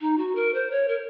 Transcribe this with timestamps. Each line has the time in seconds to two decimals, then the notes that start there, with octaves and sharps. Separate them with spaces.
0.01 D#4
0.18 F#4
0.35 A#4
0.54 C5
0.71 C#5
0.88 A#4